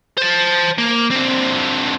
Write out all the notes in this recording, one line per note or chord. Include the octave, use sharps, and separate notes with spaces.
C5 A5
A#3
D3 C4